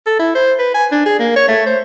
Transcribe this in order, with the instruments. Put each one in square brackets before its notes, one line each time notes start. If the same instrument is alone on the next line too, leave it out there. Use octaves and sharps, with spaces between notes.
[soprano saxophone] A4
E4
C5
B4
G#5
D4
G#4
A#3
C#5
A3
C5